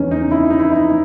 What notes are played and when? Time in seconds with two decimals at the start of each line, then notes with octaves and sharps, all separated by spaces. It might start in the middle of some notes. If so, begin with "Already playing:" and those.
Already playing: E2 C#3 E3 C#4 D#4
0.11 D#4
0.31 E4
0.50 D#4
0.60 E4
0.71 D#4
0.89 D#4